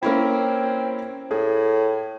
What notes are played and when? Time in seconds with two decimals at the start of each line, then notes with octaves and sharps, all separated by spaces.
0.03 A#3 C4 C#4 E4
1.31 A2 G#4